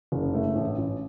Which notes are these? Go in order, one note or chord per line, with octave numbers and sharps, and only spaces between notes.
F#1
A3
A1
A1